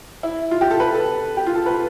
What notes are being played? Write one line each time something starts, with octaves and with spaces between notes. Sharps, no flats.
E4
F4
G4
A4
B4
A4
G4
F4
A4
B4